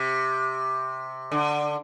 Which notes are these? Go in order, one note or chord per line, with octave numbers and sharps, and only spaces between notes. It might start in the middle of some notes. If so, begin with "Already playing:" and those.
Already playing: C3
D3